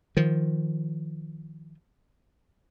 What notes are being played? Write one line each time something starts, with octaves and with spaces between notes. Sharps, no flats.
D#3 F3